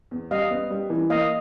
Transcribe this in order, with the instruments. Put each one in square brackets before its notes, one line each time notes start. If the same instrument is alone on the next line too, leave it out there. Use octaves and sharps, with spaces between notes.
[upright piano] E2
[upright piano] G3 [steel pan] D#5 F5
[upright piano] B3
G3
E3
[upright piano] A#3 [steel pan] D#5 F5